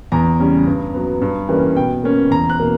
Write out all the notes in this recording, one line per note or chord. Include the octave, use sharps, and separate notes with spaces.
E2 A#5
C#3 G3 C#4
G2
F#3 B3
G2
E3 G3 A#3 C#4
B2 G5
A#3 C#4
E2 A#5
F#6
B2 A#3